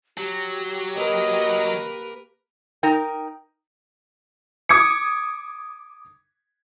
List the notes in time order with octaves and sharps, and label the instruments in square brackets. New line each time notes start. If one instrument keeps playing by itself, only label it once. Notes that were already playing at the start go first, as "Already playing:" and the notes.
[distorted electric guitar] F#3 [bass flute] G4
[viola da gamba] A#3 A#4 B4 [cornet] D#5
[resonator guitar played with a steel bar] D#4 A#4 G5
[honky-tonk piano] D6 D#6 G#6 C#7